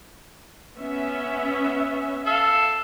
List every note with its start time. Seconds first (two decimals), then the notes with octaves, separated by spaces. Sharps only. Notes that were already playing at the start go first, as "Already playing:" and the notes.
0.77 B3 C#4 E5
2.26 A4 E5 F5